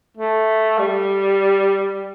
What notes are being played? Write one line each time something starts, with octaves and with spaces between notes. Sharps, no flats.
A3
G3